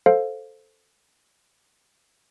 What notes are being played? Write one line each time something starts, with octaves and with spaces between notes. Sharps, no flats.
A4 C5 F5